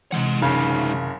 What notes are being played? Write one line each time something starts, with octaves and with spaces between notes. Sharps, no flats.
C3 E3 G#3 F#5
F#1 C#2 C#3 D#4